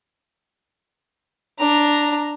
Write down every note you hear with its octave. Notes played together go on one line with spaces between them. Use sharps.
D4 A#5